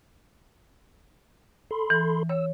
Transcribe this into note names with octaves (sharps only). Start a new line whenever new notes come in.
A4 B5 C6
E3
C#5 E6